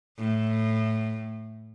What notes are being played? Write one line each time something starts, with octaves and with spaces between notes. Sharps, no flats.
A2